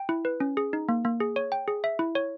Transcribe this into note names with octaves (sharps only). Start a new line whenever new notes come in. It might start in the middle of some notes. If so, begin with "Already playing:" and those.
Already playing: G5
E4
B4
C#4
G#4
D#4
A#3
A#3
G#4
C#5
G5
G#4
E5
E4
C#5